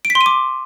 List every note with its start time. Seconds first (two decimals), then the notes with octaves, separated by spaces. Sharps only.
0.05 D7
0.10 B6
0.15 C6
0.21 D#7
0.26 D6